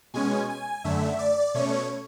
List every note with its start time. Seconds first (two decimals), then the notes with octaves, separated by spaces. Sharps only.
0.14 B2 G#3 C#4 G#5
0.50 G#5
0.84 F#2 D3 A3 E5
1.19 D5
1.54 B2 A3 C#4 C#5